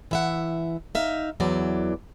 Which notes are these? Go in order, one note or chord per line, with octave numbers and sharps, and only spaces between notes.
E3 E5 F#5
D#4 E5 F5
E2 E3 F#3 D5